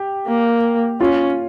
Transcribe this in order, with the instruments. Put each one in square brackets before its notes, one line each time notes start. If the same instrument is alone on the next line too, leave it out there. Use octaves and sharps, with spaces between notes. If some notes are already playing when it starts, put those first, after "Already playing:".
Already playing: [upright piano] G4
[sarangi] A#3
[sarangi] C#4 [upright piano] F4